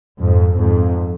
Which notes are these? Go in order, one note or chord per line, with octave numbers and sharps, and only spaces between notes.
F2 G#2
F2 G#2